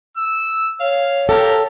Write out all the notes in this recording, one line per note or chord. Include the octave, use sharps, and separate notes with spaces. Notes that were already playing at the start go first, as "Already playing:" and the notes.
E6
C#5 F5
F4 G4 A4 A#4